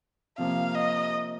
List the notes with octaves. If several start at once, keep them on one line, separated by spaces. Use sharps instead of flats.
C3 F3 A#3 F5
D#5